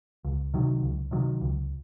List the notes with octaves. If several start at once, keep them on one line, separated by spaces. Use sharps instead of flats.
C#2
C3 D#3 F#3
C#2
C3 D#3 F#3
C#2